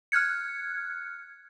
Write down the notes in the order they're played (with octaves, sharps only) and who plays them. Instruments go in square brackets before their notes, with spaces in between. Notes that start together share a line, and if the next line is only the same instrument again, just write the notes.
[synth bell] F6 F#6 G#6 C#7